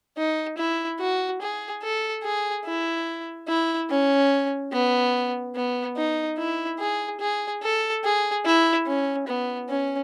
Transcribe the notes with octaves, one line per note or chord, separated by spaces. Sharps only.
D#4
E4
F#4
G#4
A4
G#4
E4
E4
C#4
B3
B3
D#4
E4
G#4
G#4
A4
G#4
E4
C#4
B3
C#4